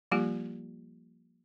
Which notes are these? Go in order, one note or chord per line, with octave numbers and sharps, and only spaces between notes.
F3 G3 A#3 F4 G4